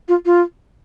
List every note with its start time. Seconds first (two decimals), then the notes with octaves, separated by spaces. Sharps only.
0.08 F4
0.26 F4